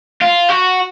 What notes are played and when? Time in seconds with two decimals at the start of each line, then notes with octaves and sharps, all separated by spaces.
0.22 F4
0.50 F#4